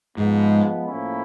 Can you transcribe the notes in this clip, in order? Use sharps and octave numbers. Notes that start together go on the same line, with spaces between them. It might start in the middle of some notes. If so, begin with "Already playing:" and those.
G#2 F3 G#3 B3
A2 F3 A#3 C#4 E4